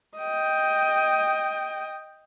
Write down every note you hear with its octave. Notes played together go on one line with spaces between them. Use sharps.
D#5 G5